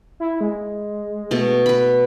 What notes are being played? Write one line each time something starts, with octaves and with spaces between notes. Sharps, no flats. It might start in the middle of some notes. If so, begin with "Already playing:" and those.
E4
G#3
B2 A3
B4 B5